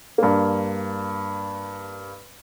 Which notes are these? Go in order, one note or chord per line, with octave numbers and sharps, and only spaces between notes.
G2 A#3